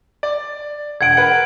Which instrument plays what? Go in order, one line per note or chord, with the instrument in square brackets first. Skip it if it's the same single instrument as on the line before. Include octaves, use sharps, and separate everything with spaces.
[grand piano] D5
[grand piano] E1 F#5 [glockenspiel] G#6 D7
[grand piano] A#4 B4 F#5